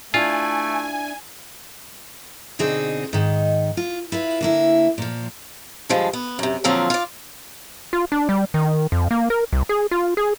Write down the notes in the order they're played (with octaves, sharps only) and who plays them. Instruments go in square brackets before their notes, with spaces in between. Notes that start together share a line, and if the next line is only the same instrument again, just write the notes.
[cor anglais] A3 [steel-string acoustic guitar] D4 E4 [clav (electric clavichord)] F4 [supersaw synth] G#5
[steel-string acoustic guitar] B2 D3 C4 D#4 G#4
G#2 D#3
F4
E4 F4 B4
D3 A#3 E4
A#2 F3
G2 D3 F3 G#3
B3
F#2 C3
A#2 D3 F3 F#3 C4 F4
F4 D5
[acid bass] F4
D4
G3
D#3
F2
A#3
A#4
C2
G#4
F4
G#4